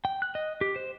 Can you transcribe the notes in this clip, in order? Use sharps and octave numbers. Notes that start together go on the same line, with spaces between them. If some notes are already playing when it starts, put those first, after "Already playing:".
G5
F#6
D#5
G4
C5